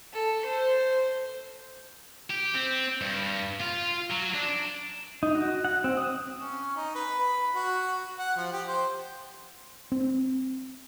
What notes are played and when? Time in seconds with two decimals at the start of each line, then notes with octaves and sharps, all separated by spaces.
0.13 A4
0.45 C5
2.30 G4
2.54 C4
3.01 G2
3.60 F4
4.10 F#3
4.34 D4
5.23 D#4
5.35 F#4
5.65 F#5
5.84 C4
5.97 D#6
6.38 C#4
6.77 D#4
6.95 B4
7.20 B5
7.55 F#4
8.18 F#5
8.37 F3
8.52 G4
8.68 C5
9.92 C4